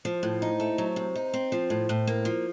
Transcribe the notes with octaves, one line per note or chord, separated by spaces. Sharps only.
F3 C5
A2
D#4
A3
F#3
C3
D#4
C4
F3
A2
A2
A#3
F3